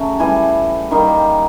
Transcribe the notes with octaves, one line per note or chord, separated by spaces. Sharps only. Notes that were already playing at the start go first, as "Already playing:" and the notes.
Already playing: C#3 F#3 A3
A2 E3 G3 G#5
D#3 G3 A#3